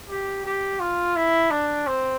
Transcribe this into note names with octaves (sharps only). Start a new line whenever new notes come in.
G4
G4
F4
E4
D4
C4